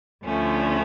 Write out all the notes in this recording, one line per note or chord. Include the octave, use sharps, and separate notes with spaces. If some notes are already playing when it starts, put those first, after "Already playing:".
D2 D3 F3 A3 C#4